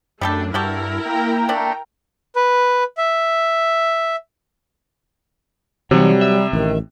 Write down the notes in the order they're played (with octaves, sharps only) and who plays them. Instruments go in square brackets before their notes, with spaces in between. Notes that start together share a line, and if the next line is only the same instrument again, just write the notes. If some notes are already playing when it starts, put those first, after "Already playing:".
[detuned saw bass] F#2 [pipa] G3 G4 A4 [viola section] A3 D4
[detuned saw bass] G2 [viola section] E4 A#4 [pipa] F#4 G4 A4
[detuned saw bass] A#3 [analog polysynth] G5 A#5
[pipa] A3 D4
[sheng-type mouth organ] B4
E5
[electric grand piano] C3 [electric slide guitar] E3 D#4 C#5 [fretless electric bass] F#3 [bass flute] G3
[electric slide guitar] E5
[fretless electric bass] A1 [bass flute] D#3